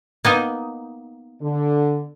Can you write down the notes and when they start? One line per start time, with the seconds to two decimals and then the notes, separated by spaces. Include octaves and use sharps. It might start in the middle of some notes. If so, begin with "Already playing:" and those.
0.25 A#3 B3 D#4
1.42 D3